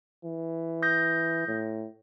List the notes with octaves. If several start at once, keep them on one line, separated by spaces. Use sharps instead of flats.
E3
D#6 G6 A#6
A2